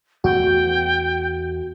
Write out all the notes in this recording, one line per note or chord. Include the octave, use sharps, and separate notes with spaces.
E2 A3 F#4 G5